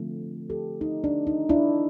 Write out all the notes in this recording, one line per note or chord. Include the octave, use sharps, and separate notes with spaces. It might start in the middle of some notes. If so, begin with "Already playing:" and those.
Already playing: D3 F3 A3 C4
G4 A4
D#4
D4
D#4
D4 E4